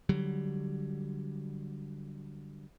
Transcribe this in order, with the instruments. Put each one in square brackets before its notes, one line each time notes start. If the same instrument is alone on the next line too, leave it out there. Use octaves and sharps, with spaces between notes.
[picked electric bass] D3 F#3 G3